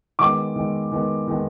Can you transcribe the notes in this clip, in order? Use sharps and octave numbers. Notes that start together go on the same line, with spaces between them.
D#3 G#3 B3 D6
D#3 G#3 B3
D#3 G#3 B3
D#3 G#3 B3